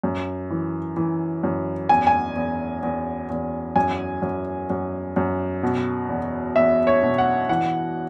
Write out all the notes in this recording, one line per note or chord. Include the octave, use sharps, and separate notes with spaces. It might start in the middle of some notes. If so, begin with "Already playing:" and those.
F#2
E3
E3
F#2
E2 G#5
G#5
E2
E2
E2
F#2 G#5
F#2
F#2
F#2
B2
E2
E2 E5
C#5
B2
F#5
E3 F#5